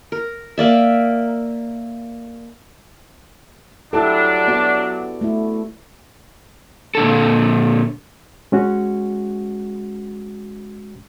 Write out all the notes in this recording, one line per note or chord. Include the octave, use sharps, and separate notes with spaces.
A#4
A#3 D5 E5
F#3 D4 E4 G4 A4
B3 F#4 D5
A3 E4
A#2 D3 A4
G#3 C#4 F#4